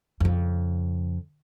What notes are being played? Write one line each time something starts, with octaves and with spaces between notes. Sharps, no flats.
F2 C#3